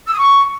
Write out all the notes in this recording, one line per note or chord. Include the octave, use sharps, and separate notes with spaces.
E6
D#6
C#6